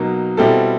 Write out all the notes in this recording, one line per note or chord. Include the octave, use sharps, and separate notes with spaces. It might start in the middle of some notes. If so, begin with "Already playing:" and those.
Already playing: B2 F#3 A#3 D#4
B2 G3 C4 E4 A4